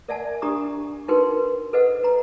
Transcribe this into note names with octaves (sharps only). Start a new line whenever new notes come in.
A#4 D5 E5 F#5 G#5 A5
D4 G4 A#5 C#6 D#6
D#4 F#4 A#4 B4 G5 C6
A4 B4 C5 D#5 F#5
B4 A#5